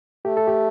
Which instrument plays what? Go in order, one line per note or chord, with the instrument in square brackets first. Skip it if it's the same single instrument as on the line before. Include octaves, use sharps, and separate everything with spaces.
[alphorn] A3 [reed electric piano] G4
[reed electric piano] A4
G4